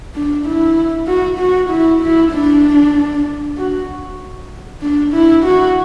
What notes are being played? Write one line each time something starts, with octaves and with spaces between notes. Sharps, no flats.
D4
E4
F#4
F#4
E4
E4
D4
F#4
D4
E4
F#4